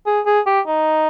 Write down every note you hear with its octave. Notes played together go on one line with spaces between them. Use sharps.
G#4
G#4
G4
D#4